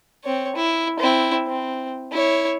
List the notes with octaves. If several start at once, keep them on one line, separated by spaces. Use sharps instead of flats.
C4 C#5
E4
C4 E4
C4
E4 C#5